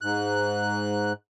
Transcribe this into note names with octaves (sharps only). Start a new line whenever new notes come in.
G#2 F#6